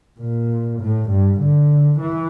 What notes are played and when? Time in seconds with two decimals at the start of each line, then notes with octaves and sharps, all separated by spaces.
0.19 A#2
0.80 A2
1.09 G2
1.40 D3
1.99 E3